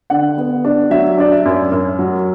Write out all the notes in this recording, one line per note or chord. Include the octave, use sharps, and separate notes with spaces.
D3 F#5
B3
D4
F#3 E5
D4 D5
E5
F#2
F#2
F#3